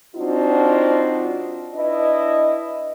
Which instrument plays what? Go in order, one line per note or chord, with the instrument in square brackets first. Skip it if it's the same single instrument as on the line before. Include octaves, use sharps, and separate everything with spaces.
[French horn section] F#3 C4 D4 D#4 F4 F#4
D4 E4 B4 D#5